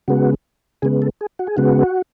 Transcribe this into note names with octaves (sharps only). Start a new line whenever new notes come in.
C#3 G#3 B3 F#4
C#3 G#3 B3 G#4
A4
G#4
F#4
G#4
C#3 G#3 B3 F#4